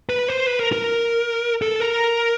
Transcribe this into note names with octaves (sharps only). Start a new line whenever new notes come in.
B4
C5
B4
A#4
A#4
A4
A#4